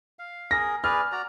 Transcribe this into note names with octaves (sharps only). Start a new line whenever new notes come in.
F5
G#4 A#4 A#6
G#4 B4 D5 F6
F#4 D5 A#5